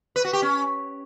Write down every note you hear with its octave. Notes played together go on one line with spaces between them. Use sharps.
B4
F#4
G4
C#4